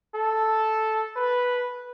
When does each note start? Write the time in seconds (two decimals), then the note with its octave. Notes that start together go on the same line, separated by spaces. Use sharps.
0.14 A4
1.16 B4